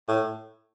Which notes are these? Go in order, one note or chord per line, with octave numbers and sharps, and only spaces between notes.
A2